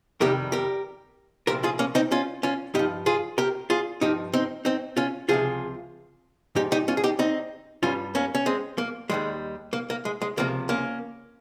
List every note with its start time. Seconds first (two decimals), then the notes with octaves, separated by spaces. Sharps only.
0.21 F2 C3 D#3 G3 G4 A#4
0.52 G4 A#4
1.47 C2 A#2 F3 G4 A#4
1.63 F4 G#4
1.79 A#3 C#4
1.95 C4 D#4
2.12 C#4 F4
2.43 C#4 F4
2.75 G2 F3 D#4 G4
3.06 F4 G#4
3.38 G4 A#4
3.70 F4 G#4
4.01 G2 F3 D#4 G4
4.33 C4 D#4
4.65 C4 D#4
4.97 C#4 F4
5.29 C#2 C3 F3 F4 G#4
6.55 G#2 F3 D#4 G4
6.72 D#4 G4
6.88 C#4 F4
6.97 G#4
7.04 D#4 G4
7.19 C4 D#4
7.83 G2 G3 C#4 F4
8.15 A#3 C#4
8.35 C#4
8.46 G#3 C4
8.78 A#3
9.10 D#2 D#3 G3 G#3
9.73 A#3
9.90 A#3
10.05 G#3
10.22 G#3
10.37 C#2 C3 F3 A#3
10.69 A#3 C#4